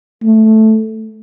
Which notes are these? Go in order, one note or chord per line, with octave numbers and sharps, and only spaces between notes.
A3